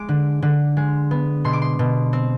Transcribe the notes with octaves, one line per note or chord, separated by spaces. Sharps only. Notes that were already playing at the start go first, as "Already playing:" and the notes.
Already playing: G#3 D6
D3
D3
G#3
B3
B2 C6
D6
C6
B2
C4